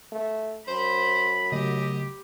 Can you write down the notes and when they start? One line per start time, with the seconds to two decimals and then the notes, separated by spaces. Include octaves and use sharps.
0.12 A3
0.68 F#2 C5 B5
1.52 C#3 F#3 A3 G4 D#5